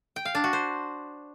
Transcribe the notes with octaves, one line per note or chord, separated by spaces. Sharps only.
G5
F5
D4
F#4
C5